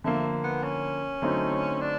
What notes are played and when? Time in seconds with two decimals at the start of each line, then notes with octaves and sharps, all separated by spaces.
0.04 D3 F3 A3 A#3
0.44 B3
0.63 C#4
1.22 D3 F#3 A3 C4 D#4
1.81 D4